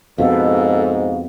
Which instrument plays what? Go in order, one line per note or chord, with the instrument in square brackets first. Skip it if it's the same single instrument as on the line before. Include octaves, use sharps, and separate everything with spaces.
[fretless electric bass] F2 B2 [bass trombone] G#2 [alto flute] A4 [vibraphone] F5